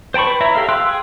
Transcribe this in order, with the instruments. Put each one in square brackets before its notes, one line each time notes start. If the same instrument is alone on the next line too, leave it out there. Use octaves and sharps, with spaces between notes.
[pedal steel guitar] C5 G5 A5 B5 C#6
B4
E4 C#5 E5 A#5
G4 A4 E5 F5
F5 G5 C6 E6 F#6
G#4 G5